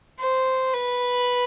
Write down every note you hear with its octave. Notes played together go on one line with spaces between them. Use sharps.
C5
B4